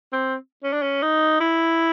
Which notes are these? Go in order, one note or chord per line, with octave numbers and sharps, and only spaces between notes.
C4
C#4
D4
C#4
D#4
E4